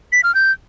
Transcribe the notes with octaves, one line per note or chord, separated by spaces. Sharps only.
B6
F6
G6